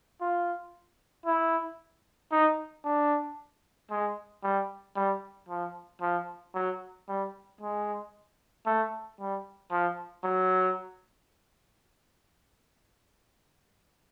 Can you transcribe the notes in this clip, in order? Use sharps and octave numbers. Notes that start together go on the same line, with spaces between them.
F4
E4
D#4
D4
G#3
G3
G3
F3
F3
F#3
G3
G#3
A3
G3
F3
F#3